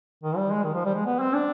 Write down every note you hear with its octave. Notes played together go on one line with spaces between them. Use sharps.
D#3
G3
G#3
D#3
F3
G3
G#3
B3
C4
D4